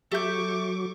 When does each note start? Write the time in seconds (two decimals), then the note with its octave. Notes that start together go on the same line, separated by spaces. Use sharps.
0.11 F#3 G4 A4 E5 C#6 D6 G6